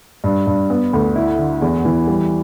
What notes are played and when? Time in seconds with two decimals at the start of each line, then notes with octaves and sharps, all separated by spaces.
0.24 G2
0.47 G2
0.70 B3
0.93 D2
1.15 E4
1.39 D3
1.62 E2
1.85 E3
2.08 G3